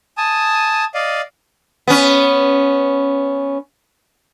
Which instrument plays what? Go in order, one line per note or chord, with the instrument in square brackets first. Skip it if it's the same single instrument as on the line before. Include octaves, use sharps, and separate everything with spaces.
[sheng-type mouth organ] G#5 A5 D#6
D5 D#5 F5
[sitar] B3 C#4